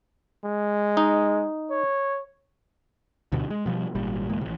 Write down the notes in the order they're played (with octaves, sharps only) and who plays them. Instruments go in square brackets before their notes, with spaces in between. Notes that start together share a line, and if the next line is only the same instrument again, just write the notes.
[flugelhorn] G#3
[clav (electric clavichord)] D#4
[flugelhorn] C#5
[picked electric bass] D2 G2 B2 D3
G#3
B2 F3 G3
G#1 A#2 G3
D1 A1 G#3 A#3
A1 C3